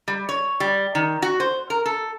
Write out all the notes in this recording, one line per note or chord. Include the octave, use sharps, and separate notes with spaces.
G3
C#5
G3
D#3
F#4
C5
A#4
A4